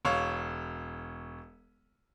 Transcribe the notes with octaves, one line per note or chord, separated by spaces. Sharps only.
E1 C#5 F5